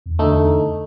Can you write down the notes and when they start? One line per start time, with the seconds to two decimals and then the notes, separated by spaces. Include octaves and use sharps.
0.06 E2
0.19 D2 A3 D#4